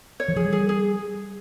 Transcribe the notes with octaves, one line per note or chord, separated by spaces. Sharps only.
C#5
E3
F3 G#4
G3
G#4
G#4